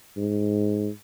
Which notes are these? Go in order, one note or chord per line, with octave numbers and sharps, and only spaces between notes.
G#2